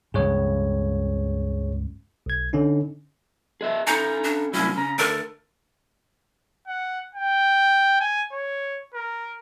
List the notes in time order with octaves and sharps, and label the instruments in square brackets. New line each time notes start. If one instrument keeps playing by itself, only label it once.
[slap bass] C#2 G2 [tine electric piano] G#4 C#5
[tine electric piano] B1 G#6
D3 C#4 D#4
[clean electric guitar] G#4 D#5 E5
[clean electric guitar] C#4 A4 G#5 [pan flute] D#4 [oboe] A#5
[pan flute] D4
[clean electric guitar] C2 A2 F#3 [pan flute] C#4 [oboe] E4
[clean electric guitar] C#3 [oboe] A#5
[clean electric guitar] D2 [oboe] A4 [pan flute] A#4
[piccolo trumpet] F#5
G5
G#5
C#5
A#4